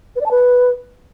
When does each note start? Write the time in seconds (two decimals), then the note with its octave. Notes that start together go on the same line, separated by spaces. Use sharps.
0.16 B4
0.21 D5
0.26 A5
0.31 B4